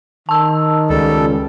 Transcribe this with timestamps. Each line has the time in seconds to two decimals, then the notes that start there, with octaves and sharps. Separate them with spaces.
0.29 D#3 A5 E6
0.89 C#2 G3 A4